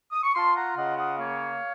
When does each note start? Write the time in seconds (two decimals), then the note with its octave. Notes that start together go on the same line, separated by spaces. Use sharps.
0.12 D#6
0.23 C#6
0.35 F4 A5 C6
0.56 F#5 A#5
0.76 C#3 D#5 F#5
0.97 D#5 F#5
1.18 A#3 C#5 F5